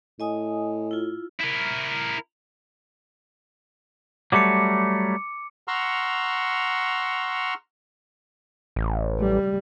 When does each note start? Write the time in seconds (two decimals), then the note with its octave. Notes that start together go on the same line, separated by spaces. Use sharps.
0.20 A2 D#5 G#5 D#6
0.91 E4 F4
1.41 E4 A#4
4.32 F#3 G3 A3 D6 C#7
5.68 F#5 A#5 C6 C#6 E6 F6
8.76 A1
9.21 G3